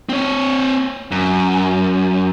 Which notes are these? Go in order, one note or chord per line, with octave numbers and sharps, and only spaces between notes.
C4 C#5
F#2